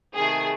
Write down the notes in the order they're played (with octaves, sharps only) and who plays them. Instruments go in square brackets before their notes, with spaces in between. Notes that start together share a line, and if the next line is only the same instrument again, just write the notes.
[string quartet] C3 D#3 A3 [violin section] G#4